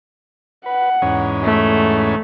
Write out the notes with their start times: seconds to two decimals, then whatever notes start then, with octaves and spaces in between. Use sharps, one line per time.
0.66 B4 F#5
1.02 E2 G#2 C#4
1.44 A3